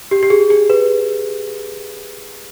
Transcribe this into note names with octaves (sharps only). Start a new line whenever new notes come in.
G4
G4
G#4
G#4
B4